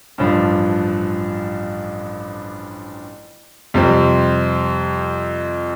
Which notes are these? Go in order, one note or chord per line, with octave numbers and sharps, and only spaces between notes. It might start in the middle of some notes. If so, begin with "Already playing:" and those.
A1 G2 F3 D4 F4
F2 C3 G3 C4